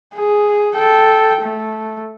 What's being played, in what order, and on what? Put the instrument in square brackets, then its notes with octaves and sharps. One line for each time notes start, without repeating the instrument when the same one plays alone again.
[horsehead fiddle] G#4
A4 G5
A3